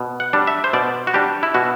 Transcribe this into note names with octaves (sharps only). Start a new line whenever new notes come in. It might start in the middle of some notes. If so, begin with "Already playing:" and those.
Already playing: B2
F#5
G3 D4
E5
C5
B2 D5
F#4
G3 D4 G4
E4
B2 F#4